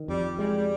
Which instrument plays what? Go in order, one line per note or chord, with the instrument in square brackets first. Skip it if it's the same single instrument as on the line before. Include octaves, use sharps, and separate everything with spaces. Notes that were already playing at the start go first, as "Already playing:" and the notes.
Already playing: [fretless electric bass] D#3
[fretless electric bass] F2 [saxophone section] G3
[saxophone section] G3 [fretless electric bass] G#3